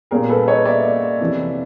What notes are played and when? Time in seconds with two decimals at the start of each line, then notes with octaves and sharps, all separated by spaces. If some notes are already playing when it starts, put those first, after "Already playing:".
0.11 A#2 G3 A#3 C#4 G#4 A#4
0.29 A4 B4
0.48 C#5 D#5
0.65 D5 E5
1.19 F2 C3 E3